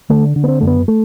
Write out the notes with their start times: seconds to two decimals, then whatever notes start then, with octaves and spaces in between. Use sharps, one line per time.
0.10 D3 A3
0.36 D3
0.44 B3
0.48 C4
0.61 F#2 A3
0.67 B3
0.88 A3